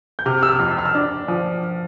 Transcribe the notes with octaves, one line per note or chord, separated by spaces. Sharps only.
G6
C3 F6
E6
F6
F2
E6
F6
E6
D4
F3